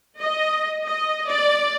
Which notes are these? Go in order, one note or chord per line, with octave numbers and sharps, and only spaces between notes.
D#5
D#5
D5